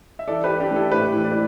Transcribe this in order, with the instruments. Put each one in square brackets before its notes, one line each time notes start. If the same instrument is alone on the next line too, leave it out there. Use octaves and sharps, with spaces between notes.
[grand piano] E5
[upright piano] E3 [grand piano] A4 D5
[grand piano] G4 B4
[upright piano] E3
[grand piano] D4 G4
[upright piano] A3
[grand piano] E4 A4
[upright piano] A2 [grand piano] G4 B4
[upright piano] E3
[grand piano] D5
B4